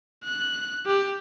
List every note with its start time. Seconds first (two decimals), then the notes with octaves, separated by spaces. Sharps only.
0.24 F#6
0.86 G4